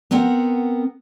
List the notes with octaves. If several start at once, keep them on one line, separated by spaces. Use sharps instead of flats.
B3 C4 A#4 F#5